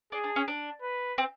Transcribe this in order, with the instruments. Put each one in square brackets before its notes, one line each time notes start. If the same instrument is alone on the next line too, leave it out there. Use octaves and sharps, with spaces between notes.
[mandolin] D4 [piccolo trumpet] G#4
[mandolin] D4
C#4
D4
[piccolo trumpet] B4
[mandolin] C4